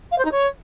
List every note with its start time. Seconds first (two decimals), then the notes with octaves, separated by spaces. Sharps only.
0.11 F5
0.18 C5
0.25 D#4
0.31 C#5